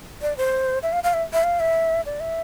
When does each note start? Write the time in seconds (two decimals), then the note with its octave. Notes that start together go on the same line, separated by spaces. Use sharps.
0.22 D5
0.37 C5
0.83 E5
0.93 F5
1.04 F5
1.14 E5
1.33 E5
1.44 F5
1.60 E5
2.06 D5
2.20 E5